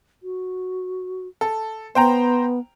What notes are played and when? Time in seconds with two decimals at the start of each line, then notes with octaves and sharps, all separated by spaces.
0.23 F#4
1.41 A4
1.95 B3 C5 G5 A#5